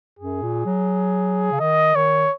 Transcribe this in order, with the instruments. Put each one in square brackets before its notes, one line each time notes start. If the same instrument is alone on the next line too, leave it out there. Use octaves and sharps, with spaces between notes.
[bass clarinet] F#2 [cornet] G#4
[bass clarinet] A#2
F#3
C#3
[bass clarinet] D#3 [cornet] D#5
[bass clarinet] D#3 [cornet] C#5